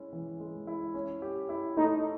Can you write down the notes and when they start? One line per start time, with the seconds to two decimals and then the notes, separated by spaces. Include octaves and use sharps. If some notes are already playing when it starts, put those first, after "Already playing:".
Already playing: G#3 C#4 E4
0.13 E3
0.40 G#3
0.67 E4
0.94 C#4
1.22 G4
1.49 E4
1.77 A3 D#4